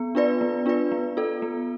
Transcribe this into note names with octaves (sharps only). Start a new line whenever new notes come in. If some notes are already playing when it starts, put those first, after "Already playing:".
Already playing: B3
D4 F4 B4 D5
B3
D4 F4 B4 D5
B3
F4 A4
B3